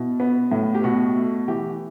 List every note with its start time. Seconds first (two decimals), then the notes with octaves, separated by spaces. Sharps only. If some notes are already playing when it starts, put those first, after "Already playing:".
Already playing: B2 E4
0.20 B3
0.51 A2
0.75 G4
0.84 B2 F#4
1.16 A3
1.48 E3 G4